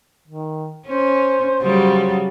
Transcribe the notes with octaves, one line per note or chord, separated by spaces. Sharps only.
D#3
C#4 C5
C#3 F#3 G3